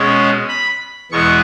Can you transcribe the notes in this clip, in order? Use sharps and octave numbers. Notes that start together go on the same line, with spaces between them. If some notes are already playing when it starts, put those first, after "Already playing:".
Already playing: B2 G#3 C#4
B5
E2 B2 G#3 B3 C#6